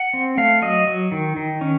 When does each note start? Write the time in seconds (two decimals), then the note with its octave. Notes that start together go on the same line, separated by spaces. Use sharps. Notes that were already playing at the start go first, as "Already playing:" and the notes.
Already playing: F#5
0.14 C4
0.38 A3 F5
0.62 F#3 D#5
0.87 F#3
1.12 D#3
1.36 D#3
1.61 C#4